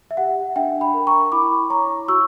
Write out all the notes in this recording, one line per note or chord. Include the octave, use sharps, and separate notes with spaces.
E5
G4 F#5
D4 E5 G5
G5 B5
A#4
A#5 C#6
E4 B5 D6
C#5 A#5 C#6
F#4 C#6 E6